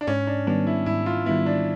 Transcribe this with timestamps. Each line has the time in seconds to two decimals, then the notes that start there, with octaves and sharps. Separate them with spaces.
0.01 D4
0.07 G#2 C#4
0.27 D4
0.47 D#3 G3 B3 D4
0.67 E4
0.86 G#2 E4
1.06 F4
1.26 D#3 G3 B3 E4
1.46 D4